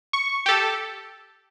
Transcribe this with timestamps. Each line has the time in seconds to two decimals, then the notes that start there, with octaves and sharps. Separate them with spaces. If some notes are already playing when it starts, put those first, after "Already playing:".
0.13 C#6
0.46 G4 A4